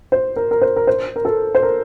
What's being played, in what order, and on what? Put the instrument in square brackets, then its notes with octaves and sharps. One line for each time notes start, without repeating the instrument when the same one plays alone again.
[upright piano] C5
A#4
A#4
C5
A#4
C5
A#4
A4
C5
A#4